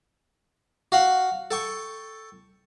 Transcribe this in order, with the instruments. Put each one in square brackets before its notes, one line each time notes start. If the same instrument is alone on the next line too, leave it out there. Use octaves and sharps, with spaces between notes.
[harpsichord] F#4 F5 F#5
A4 G5 C#6